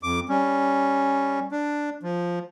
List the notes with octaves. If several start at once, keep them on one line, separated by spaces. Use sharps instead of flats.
F2 D6
G3 C#4
D4
F3